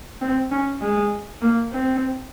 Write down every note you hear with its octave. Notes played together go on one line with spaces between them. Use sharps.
C4
C#4
G#3
A#3
C4